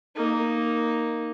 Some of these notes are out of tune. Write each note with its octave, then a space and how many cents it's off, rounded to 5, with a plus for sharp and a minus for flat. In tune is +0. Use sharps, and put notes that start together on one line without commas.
A#3 +0 D#4 +0